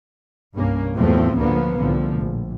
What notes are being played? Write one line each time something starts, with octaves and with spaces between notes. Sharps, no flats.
C2 G2 A#3 C#4
E2 A2 F3 F#3 A3 C4
D2 D3 F3 A#3 B3
C2 A2 D3 F3
A#1